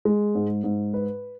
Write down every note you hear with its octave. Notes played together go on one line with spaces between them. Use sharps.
G#3
G#2
G#2
B4